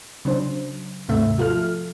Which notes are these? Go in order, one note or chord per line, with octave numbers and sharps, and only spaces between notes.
C#3 F#3 D4 C5
D#2 G#2 C3 A3 E5
F3 F4 A4 F6